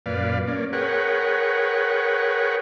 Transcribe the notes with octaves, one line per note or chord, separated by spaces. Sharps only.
F#2 A#2 B4 D5 F5
A#3 C#4 D5
G#4 A#4 B4 C#5 F#5 G5